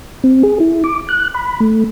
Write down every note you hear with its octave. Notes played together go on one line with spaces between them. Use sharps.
C4
G#4
E4
D6
F#6
B5
A3